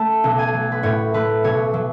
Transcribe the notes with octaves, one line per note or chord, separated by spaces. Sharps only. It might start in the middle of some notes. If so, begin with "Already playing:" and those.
Already playing: A3 A5
B1
G#5
F#3
B4
A2 C#5
A3 B4
B1 C#5
F#3